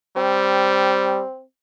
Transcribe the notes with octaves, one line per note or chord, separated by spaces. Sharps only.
G3 C4